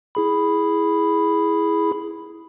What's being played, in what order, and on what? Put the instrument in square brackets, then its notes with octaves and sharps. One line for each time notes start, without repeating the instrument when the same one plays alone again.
[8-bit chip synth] E4 G#4 B5